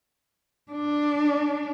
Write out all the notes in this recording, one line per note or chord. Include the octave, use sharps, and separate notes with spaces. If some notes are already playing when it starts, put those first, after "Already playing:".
D4